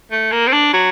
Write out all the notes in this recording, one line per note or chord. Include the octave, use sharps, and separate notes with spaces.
A3
A#3
C4
D4
F#3